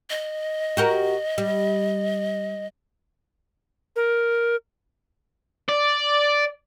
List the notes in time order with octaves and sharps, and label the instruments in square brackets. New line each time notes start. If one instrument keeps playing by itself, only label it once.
[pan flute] D#5
[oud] F#4 G4 A#4
G3
[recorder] A#4
[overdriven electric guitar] D5